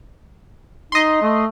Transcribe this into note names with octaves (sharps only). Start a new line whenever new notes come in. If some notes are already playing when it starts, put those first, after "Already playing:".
D#4 D#5 C6
A3